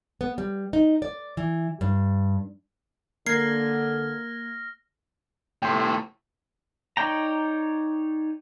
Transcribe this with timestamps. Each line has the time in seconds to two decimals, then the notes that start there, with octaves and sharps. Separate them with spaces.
0.21 B3
0.38 G3
0.73 D#4
1.02 D5
1.37 E3
1.81 G2
3.26 D3 A#3 F6 G#6 A#6 C7
5.62 C2 A2 G5 C6
6.97 D#4 C#5 D5 G5 A#5